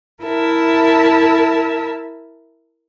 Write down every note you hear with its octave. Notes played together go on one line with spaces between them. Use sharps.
E4 A#4 E5 A5